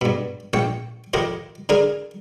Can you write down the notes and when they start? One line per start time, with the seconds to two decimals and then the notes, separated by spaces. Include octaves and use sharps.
0.01 G2 B2
0.53 A#1 G5 C#6
1.13 F2 C3 D#3 G4 D#5
1.69 D3 D4 G#4 A#4